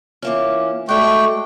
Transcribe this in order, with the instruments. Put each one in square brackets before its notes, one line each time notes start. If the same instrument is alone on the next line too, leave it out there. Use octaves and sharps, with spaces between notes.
[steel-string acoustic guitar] E3 A#3 C#4 [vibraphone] F4 E5 D6
[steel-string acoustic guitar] G#3 D5 [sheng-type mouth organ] A3 G5 [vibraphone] F#4 D6 [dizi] C#6